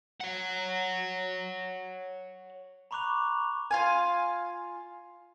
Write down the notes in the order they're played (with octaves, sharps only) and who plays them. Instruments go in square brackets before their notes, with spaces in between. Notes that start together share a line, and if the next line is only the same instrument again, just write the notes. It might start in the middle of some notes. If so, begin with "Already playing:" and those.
[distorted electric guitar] C#5 F#5
[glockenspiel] A#5 B5 C#6 D6 F#6 F7
[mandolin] F4 F5 G#5